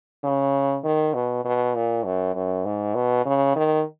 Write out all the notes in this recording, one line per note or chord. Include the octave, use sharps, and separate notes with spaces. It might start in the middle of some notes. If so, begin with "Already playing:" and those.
C#3
D#3
B2
B2
A#2
F#2
F#2
G#2
B2
C#3
D#3